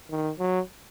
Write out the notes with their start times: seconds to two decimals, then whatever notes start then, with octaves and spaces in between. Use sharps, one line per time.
0.10 D#3
0.39 F#3